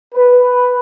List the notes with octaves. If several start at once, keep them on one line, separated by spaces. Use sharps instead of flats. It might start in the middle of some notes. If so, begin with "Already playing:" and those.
B4